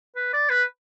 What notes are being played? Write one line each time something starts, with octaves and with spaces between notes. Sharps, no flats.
B4
D5
B4